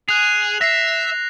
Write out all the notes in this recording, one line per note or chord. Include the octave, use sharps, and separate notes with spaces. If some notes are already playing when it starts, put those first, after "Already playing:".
G#4 F#6 F7
E5 A#6 C7